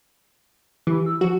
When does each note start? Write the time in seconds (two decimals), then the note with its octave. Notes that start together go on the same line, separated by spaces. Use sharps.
0.87 E3 G4
1.06 E6
1.21 F3 F#4